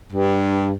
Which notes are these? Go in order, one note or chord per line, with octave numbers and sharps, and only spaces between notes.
G2